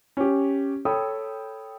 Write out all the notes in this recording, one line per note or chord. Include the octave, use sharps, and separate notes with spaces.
C#4 G4
A4 C#5 G5 B5 D#6